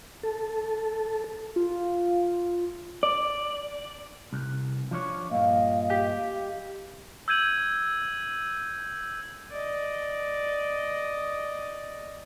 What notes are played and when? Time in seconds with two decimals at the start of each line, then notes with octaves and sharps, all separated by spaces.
0.23 A4
1.56 F4
3.03 D5
4.33 C2
4.91 F3 D4 C#5
5.31 G2 A#2 D#5 F5
5.90 G4
7.28 E6 G6 G#6 D#7 F#7
9.50 D5 D#5